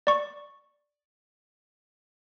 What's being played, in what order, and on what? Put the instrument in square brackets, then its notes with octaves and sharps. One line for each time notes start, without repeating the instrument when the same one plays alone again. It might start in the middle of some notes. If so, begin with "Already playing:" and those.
[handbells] D5 C#6